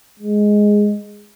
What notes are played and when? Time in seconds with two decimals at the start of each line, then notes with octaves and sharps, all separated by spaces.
0.20 G#3